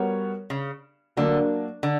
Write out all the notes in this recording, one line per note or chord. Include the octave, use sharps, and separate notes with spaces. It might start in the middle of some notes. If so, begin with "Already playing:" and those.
Already playing: G3 B3 F#4 A#4 C#5
C#3
D3 F#3 A#3 D4 A#4
D3